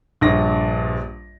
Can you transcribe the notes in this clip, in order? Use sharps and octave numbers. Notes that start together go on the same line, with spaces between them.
A#1 G2 A#6